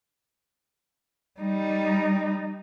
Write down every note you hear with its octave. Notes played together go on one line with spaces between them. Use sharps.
G3 D#4